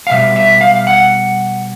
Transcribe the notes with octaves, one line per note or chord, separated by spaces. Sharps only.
F5
B2 G3 E5
E5
F5
F#5